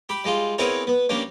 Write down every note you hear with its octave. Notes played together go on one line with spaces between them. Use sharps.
G4 B5
G3 G#3 F4
B3 C4 E4 G#4 A#4 C#5
B3
G3 A#3 C#4 D4